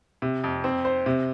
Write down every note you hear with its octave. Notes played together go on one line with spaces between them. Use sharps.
C3
F2
C4
C5
C3